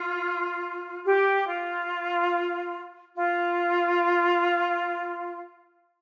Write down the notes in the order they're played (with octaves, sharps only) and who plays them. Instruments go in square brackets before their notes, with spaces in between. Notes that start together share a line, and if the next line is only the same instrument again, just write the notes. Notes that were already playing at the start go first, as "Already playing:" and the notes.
Already playing: [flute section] F4
G4
F4
F4